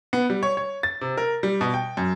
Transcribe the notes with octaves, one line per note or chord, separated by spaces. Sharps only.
B3
G3
C#5
C#5
A6
C3
A#4
G3
B2
G5
F#2